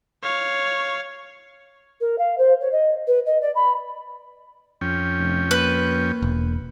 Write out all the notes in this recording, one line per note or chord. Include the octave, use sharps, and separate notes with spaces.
C#5 F5
A#4
F5
C5
C#5
D#5
B4
D#5
D5
B5
F2 C#4 G5
F1
A#3 B4
E1